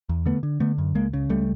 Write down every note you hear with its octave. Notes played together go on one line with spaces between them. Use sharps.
E2
D3 A3 B3
D3
D3 A3 B3
F#2
C#2 G#3 A#3
C#3
C#2 G3 A3